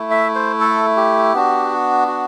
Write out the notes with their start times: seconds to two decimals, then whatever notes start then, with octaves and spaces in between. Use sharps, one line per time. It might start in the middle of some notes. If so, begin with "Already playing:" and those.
Already playing: A3 E4
0.11 E5
0.35 C5
0.61 A4
0.96 G4
1.34 B3 D4 F#4
2.08 F#4